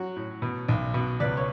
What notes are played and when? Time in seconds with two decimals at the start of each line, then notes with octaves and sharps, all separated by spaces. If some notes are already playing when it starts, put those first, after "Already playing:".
Already playing: F#3 F#4
0.16 A2
0.42 B2
0.69 B1
0.94 B2 F#4
1.20 C#2 B4 D5
1.37 C#5